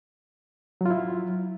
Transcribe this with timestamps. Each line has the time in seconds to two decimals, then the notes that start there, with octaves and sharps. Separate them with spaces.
0.81 F#3
0.86 F4
0.90 E4